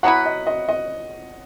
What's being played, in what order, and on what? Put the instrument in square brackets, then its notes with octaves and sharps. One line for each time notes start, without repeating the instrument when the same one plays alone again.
[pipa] F#3 B3 E4 B4 [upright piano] F#5
[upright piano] D#5
D#5
D#5